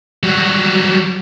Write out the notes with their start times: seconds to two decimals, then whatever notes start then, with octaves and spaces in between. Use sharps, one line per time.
0.23 F#3 G3